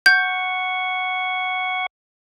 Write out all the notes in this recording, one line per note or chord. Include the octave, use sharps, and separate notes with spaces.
F#5 C#6 G6